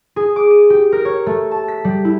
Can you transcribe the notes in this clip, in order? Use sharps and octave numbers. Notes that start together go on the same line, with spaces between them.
G#4
D6
D#7
G4
A#4
C#5
A3
A5
B6
G3
E4